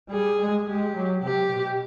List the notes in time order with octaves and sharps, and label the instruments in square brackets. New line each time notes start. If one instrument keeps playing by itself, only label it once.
[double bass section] G3 [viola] G#4
[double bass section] G#3
[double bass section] G#3 [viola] G4
[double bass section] F#3
[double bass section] C3 [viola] G4
[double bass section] B2